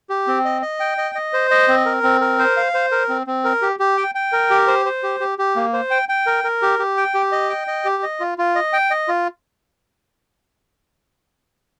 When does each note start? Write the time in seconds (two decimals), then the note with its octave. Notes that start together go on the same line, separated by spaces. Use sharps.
0.10 G4
0.27 C4
0.45 D#5
0.62 D#5
0.80 G5
0.98 D#5
1.15 D#5
1.33 C5
1.51 D#5
1.68 C4
1.85 A#4
2.03 C4
2.21 A#4
2.39 C5
2.57 F5
2.74 C5
2.91 A#4
3.09 C4
3.27 C4
3.44 A#4
3.62 G4
3.80 G4
3.97 G5
4.15 G5
4.32 A#4
4.50 G4
4.68 C5
4.86 C5
5.03 G4
5.20 G4
5.38 G4
5.56 A#3
5.73 C5
5.91 G5
6.09 G5
6.26 A#4
6.44 A#4
6.62 G4
6.79 G4
6.97 G5
7.14 G4
7.32 D#5
7.50 G5
7.67 D#5
7.85 G4
8.03 D#5
8.20 F4
8.38 F4
8.55 D#5
8.73 G5
8.91 D#5
9.08 F4